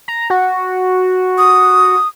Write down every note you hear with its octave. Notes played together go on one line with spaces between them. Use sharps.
A#5
F#4
D#6